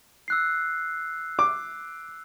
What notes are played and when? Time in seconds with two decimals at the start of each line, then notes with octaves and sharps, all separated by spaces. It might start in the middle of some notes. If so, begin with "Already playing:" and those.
0.28 E6 F#6 C7
1.39 D6